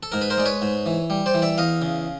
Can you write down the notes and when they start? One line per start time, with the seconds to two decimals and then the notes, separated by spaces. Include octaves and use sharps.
0.03 A4
0.12 G#2 A#4
0.22 B4
0.30 A#4 C5
0.38 G#3 D5
0.46 B4 C#5
0.62 G#2
0.86 E3
1.10 G3
1.26 C5 D5
1.34 E3
1.42 D5 E5
1.58 E2 D#5 F5
1.82 C#3